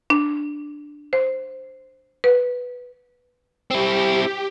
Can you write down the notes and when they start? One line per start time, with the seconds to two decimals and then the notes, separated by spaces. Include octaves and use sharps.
0.10 D4
1.13 C5
2.24 B4
3.71 C4 E4 G4